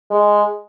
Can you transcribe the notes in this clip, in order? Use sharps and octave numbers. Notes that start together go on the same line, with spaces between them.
G#3